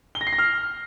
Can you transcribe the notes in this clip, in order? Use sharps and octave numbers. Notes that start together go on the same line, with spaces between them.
G7
A#6
C7
A#6
F6